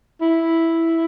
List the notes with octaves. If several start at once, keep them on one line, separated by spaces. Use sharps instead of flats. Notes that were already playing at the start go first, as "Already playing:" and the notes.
E4